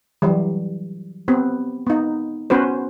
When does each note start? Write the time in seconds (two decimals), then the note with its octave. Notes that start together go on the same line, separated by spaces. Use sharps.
0.22 E3 F#3 G3
1.28 B3 C4 G4
1.87 B3 D#4
2.50 B3 C#4 F#4 B4 C5